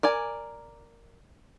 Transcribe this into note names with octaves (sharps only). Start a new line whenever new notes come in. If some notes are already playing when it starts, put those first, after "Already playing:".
A#4 D5 G#5